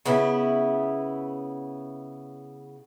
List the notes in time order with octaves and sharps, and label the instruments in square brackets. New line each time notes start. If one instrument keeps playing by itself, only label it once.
[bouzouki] C#3 B3 E4